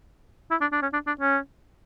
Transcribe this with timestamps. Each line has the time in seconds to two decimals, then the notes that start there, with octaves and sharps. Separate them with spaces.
0.51 E4
0.61 D4
0.72 D4
0.82 C#4
0.93 D4
1.07 D4
1.21 C#4